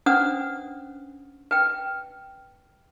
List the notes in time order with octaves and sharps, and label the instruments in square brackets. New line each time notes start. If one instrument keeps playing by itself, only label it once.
[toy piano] C#4 D4 B4 C5 F#5 D#6
B4 G5